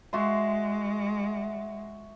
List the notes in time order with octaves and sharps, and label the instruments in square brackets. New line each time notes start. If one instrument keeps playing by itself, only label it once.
[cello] G#3 [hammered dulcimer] F#4 E5 C6